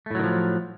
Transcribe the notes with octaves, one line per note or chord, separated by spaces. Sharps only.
A2 D#3 F3 F#3 A3